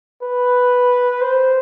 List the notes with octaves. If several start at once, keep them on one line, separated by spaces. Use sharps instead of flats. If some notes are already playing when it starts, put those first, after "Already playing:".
B4
C5